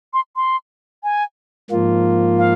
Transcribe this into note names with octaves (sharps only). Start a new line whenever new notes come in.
C6
C6
G#5
G#2 F3 A#3 F4
F5